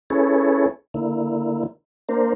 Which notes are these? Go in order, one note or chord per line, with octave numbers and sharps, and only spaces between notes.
C#4 E4 G#4 A4 B4 C#5
D3 A#3 E4
A#3 D4 A#4 C5